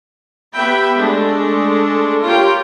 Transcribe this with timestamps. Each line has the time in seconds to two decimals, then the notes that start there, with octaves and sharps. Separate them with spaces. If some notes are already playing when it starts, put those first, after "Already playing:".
0.54 B3 G4 E5 G5 B5
0.97 G#3 A3 D4 A4
2.23 F4 G4 A#4 C#5 G5